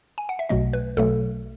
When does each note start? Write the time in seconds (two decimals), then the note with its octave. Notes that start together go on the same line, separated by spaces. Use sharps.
0.18 G#5
0.29 F#5
0.39 E5
0.49 B1 B2 F#3 A3 D#5
0.73 B4
0.97 B1 B2 F#3 A3 A4